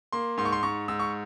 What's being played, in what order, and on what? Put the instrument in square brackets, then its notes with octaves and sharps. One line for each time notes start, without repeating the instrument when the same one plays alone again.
[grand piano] A#3 C6
G#2 C6
C#6
C6
G#2 C#6
G#2 E6
C#6